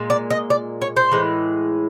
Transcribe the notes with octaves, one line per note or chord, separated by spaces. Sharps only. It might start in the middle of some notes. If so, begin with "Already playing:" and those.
Already playing: A#2 G#3
D5
D#5
D5
C#5
C5
A2 E3 G#3